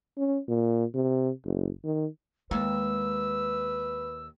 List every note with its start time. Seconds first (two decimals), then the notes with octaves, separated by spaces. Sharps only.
0.18 C#4
0.48 A#2
0.95 C3
1.45 F#1
1.84 D#3
2.51 D#2 G#3 B4 E6